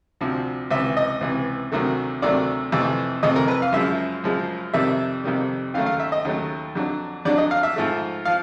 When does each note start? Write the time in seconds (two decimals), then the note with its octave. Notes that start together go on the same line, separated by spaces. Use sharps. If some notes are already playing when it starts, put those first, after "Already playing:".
0.21 D2 C3 F3
0.71 C#2 C3 E3 E5
0.97 D#5
1.21 C#2 C3 E3
1.72 D2 C3 D#3 F#3 A3
2.22 D2 C3 D#3 F#3 A3 D5
2.72 F2 C3 E3 A3
3.23 F2 C3 E3 A3 D#5
3.36 A#4
3.48 B4
3.62 F5
3.72 F#2 C#3 F3 G#3 E5
4.24 F#2 C#3 F3 G#3
4.74 F2 C3 D#3 G3 E5
5.24 F2 C3 D#3 G3
5.74 D#2 C#3 F#3 A3 F5
5.86 F5
6.00 E5
6.12 D#5
6.25 D#2 C#3 F#3 A3
6.75 F2 D3 F#3
7.25 F2 D3 F#3 D5
7.38 D#5
7.51 F5
7.63 E5
7.76 G#2 F3 A3
8.25 F3 F5